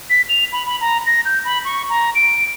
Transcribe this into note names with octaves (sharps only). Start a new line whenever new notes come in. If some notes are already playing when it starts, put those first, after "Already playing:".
B6
F7
B5
B5
A#5
A#6
G6
B5
C#6
A#5
D7